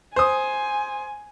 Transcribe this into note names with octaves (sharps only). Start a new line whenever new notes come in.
C5 G#5 D#6